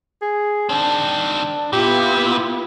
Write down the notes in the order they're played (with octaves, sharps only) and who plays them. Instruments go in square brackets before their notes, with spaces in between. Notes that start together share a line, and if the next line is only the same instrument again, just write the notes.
[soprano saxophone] G#4
[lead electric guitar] D#3 C4 [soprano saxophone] D4
[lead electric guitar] A#2 [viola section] B3 E4 F4 [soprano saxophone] G4